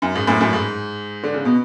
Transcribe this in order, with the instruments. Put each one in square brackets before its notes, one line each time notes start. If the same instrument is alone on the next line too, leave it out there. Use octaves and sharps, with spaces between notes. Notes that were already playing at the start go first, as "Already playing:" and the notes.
[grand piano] F#2
G#2
F#2 A2
F#2 A2
G#2
D3
C#3
B2